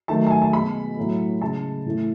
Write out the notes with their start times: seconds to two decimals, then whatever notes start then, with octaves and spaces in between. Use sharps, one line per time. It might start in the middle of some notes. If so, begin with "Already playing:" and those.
0.08 D#3 F#3 A3 A5
0.27 A5
0.31 G#5
0.42 A5
0.53 B2 G#3 B5
0.97 A2 F#3 A3
1.41 C#3 G#3 A5
1.86 A2 E3 A3